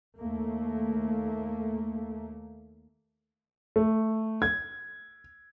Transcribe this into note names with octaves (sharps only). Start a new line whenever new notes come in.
D#2 A3 A#3
A3
G#6